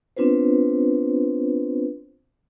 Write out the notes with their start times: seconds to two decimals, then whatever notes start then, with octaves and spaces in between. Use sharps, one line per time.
0.17 B3 C4 D4 F4 B4 C5